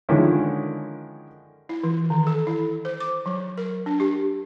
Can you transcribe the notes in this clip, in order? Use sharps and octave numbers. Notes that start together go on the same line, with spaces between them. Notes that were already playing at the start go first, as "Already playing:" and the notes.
D3 D#3 F3 G#3 C#4 E4
E4
E3
D#3
A4
E4
C5
D6
F#3
A#4
D4
G4